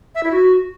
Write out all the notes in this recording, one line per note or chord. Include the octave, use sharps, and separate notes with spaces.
E5
E4
F#4